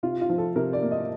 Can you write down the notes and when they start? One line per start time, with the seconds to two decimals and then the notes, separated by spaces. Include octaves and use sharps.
0.03 C3 F4
0.21 F4
0.30 F3
0.38 A4
0.56 C3 A#4
0.73 D5
0.83 A#3
0.91 D#5